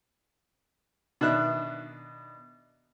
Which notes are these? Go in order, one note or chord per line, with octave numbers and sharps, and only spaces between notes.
B2 D#3 D4 E5 F#6